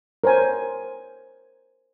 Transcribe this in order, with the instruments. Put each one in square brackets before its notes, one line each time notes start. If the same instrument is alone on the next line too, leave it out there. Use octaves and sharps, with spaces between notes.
[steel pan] A#4 C5 C#5 G#5